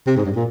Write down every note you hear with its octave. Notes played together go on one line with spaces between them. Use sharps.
C3
G#2
G2
A#2